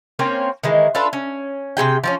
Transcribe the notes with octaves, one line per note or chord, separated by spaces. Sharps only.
A#3 C4 C#4 C#5
D#3 E3 G#3
D4 F4 A4 B4
C#4
C3 C#4 G#4 G5
F3 C4 C#4